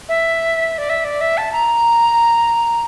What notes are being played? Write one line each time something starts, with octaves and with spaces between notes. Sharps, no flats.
E5
D5
E5
D5
E5
A5
A#5